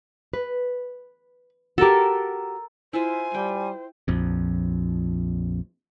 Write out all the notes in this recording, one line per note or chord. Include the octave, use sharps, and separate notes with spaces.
B4
F#4 G4 A4 A#4
E4 F4 C5 E5 G#5
G3 G5
A#1 F2